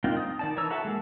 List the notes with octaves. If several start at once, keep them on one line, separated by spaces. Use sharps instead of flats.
A#3 C4 D4 D#4 F4
D#6
D#3 D5 A5
D#3 E3 C#5 A#5 E6
F#4 A4 E5 A5
G#3 A#3